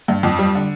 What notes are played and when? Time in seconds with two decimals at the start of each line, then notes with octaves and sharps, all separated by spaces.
0.08 G2
0.23 F2
0.39 G3
0.55 D3